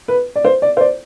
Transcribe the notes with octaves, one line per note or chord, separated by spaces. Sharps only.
B4
D5
C5
D5
C5
D5